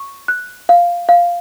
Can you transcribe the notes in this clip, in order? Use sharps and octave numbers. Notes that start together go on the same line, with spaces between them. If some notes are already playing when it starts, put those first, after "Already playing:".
Already playing: C#6
F#6
F5
F5